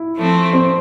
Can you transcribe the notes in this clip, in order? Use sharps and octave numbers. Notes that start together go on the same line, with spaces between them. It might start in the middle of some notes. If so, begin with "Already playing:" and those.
Already playing: E4
F3 A3 C4
C4